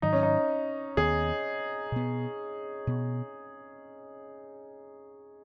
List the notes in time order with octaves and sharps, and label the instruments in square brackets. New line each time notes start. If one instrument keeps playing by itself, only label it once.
[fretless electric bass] G#2 D#3 F#3 [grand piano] D#4
[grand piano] C#4
D#4
[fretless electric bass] D#2 D#3 B3 [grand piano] G#4
[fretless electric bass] B2 B3
B2 B3